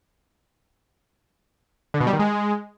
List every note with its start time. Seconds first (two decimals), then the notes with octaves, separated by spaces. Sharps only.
1.94 D3
2.00 B2
2.07 G3
2.13 D#3
2.19 G#3